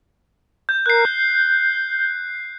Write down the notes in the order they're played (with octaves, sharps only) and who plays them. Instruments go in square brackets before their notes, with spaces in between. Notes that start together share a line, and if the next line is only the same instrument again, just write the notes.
[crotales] G6
[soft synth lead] A#4 [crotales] F#6 C7
[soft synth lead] G6